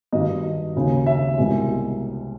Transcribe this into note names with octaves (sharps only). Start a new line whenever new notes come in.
G2 D#3 F#3 D#5
D#2 C#3 F#3
E5
C2 B2 G#3